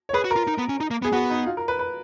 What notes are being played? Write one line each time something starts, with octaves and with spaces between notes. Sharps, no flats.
C#5
G#4 B4
F#4
A#4
F4
D#4
B3
C#4
D#4
A#3
B3 G#4
B3 F#4
D#4
F4
A#4
B4
B4